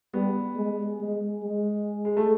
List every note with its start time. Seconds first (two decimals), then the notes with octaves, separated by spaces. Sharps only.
0.14 G3 B3
0.57 G#3
1.00 G#3
1.43 G#3
2.05 G#3
2.17 A3